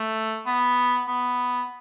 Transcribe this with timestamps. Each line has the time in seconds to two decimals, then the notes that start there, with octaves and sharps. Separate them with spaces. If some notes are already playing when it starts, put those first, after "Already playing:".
Already playing: A3
0.46 B3
1.08 B3